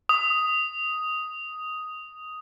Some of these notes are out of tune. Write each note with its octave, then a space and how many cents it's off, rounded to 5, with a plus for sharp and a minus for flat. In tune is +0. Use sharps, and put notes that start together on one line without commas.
D#6 +5